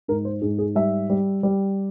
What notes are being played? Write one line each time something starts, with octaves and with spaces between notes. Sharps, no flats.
G#2 A#4
C5
G#2 G#4
G#4
G3 E5
G3
G3